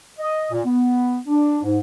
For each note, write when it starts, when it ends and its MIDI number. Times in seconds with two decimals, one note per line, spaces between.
0.19 0.46 75
0.51 0.61 46
0.66 1.18 59
1.27 1.58 62
1.63 1.78 44